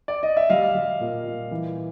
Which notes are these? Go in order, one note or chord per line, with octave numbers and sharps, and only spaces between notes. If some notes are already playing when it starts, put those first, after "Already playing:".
D5
D#5
E5
G3 D#5 F5
G3
A#2
A#2
E3